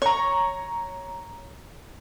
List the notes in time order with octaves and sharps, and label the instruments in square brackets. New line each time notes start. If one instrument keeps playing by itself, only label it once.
[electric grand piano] C#5 A#5 [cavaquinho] C#6